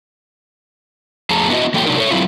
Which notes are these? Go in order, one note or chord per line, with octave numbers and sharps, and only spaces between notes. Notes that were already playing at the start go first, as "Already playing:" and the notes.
F2 A3 G#4 A5 A#5
B3 D#4 E4 F#4 D#5
E3 F#3 A#3 A4 G5
C3 F#3 D4 D#4 A#4
A4 C#5
F#3 C4 E4 F4